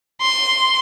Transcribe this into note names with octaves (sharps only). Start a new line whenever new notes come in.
C6